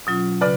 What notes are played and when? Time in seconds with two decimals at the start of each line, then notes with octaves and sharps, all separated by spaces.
0.07 B2 F#3 C#4 F4
0.41 C#3 B4 D5